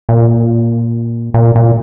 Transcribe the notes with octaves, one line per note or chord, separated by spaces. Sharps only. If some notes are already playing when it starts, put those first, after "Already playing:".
A#2
A#2
A#2